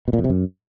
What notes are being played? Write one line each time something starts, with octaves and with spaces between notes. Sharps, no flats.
B2
A#2
F2
C3
F#2